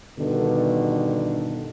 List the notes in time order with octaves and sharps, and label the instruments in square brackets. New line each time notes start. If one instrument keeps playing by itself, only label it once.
[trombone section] G2 B2 D3 D#3